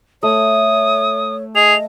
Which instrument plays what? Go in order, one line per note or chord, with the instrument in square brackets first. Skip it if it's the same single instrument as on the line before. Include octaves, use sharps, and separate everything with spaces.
[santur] A3 [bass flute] C#5 [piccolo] D#6
[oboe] G#4 [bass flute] D#5 [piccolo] F7